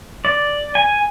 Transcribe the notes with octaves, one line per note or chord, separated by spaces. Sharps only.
D5
G#5